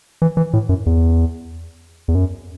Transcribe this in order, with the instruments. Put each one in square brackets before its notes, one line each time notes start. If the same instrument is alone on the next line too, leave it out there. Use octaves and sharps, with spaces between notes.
[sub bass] E3
E3
A2
F#2
E2
E2
F#2